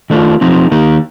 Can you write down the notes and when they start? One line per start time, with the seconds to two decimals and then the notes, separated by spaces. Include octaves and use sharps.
0.10 D#3 A3 D4 F4
0.41 F3 C4 D#4
0.71 D#3 A#3 D#4